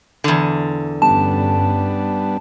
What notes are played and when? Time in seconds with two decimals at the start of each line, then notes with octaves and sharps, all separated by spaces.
0.24 E2 D3
1.02 G1 G2 G3 B3 C#4 D4 A5